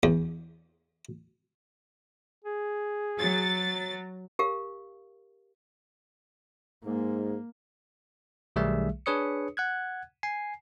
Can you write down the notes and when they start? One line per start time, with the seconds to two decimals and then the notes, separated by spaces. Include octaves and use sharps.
0.03 E2
2.45 G#4
3.18 F#3 A6
4.39 G4 A#4 F5
6.84 G#2 A#3
8.56 B1 D#3 G3 A3 G#4 E5
9.06 D4 G#4 B4 C#5 D#6 C#7
9.57 F#5 F#6 G#6
10.23 G#5 C7